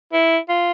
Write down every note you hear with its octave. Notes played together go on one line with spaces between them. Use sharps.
E4
F4